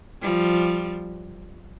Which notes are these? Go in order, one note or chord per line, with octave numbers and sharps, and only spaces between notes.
F3 G3